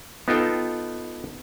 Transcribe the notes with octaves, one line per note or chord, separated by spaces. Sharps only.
B3 D#4 F4 A4 G5